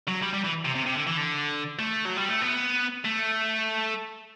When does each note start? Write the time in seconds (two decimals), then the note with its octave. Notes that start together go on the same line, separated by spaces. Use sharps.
0.08 F#3
0.23 G3
0.34 G3
0.45 E3
0.65 C3
0.76 C3
0.86 C3
0.96 D3
1.07 E3
1.17 D3
1.79 A3
2.06 F#3
2.17 G3
2.29 A3
2.42 B3
3.05 A3